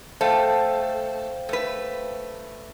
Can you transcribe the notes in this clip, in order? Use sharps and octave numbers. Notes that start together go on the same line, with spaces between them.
A3 A4 C5 F5 G5
A3 B4